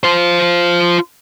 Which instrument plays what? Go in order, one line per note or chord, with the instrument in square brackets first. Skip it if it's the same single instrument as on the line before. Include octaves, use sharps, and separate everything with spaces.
[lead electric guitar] F4 C5